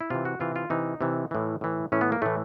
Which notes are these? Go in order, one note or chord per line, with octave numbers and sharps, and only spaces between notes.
E4
C3 E3 F4
F#4
C3 E3 F4
F4
C3 E3 D#4
C3 E3
A2 E3
A2 E3
A2 E3 C#4
B3
A#3
A2 E3 A3